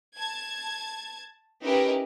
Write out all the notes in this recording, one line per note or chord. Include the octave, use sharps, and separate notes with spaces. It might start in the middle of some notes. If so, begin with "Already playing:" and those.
A5 G#6
C#4 D#4 E4 G4 A#4 B4